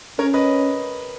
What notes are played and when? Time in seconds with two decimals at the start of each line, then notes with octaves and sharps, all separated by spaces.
0.19 C#4 A#4 C#5
0.34 B4 D#5